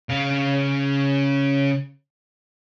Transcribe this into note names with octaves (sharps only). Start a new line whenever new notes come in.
C#3 F5